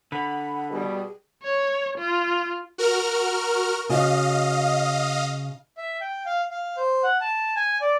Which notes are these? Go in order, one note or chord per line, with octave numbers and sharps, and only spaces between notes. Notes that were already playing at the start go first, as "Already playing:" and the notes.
D3 F#5 B5
B2 G3 G#4
C#5
F4
F#4 A#4 F6
C#3 F#4 D#5 F5
E5
G5
F5
F5
C5
F#5
A5
G#5
D5